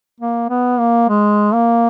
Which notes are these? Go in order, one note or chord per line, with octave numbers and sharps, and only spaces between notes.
A#3
B3
A#3
G#3
A#3